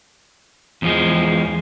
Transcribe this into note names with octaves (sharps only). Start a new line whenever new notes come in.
E2 F3 G#3